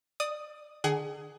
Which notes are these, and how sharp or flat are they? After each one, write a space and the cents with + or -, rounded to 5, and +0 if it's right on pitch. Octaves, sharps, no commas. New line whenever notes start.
D5 +25 D#6 +0
D3 +30 G#4 +10 F#5 +40